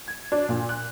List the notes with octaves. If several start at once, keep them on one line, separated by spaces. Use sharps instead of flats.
G#6
D4
A#2
F#6